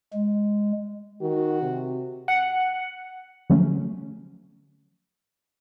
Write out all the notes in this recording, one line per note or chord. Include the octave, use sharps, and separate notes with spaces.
G#3
D#3 F#4
C3
F#5
D3 F3 F#3 A3 C#4